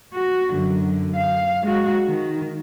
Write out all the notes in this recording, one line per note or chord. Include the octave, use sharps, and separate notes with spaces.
F#4
F#2 D3
F5
G#3 F#4
D#3